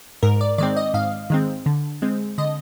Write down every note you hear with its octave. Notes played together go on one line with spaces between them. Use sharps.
G#2 A#4
D5
D#3 G#3 C4 D5
D#5
G#2 F5
D#3 G#3 C4
D3
G#3 C4
D3 D#5